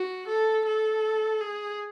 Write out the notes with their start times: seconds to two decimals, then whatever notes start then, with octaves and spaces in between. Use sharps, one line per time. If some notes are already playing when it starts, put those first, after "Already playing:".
Already playing: F#4
0.28 A4
0.66 A4
1.41 G#4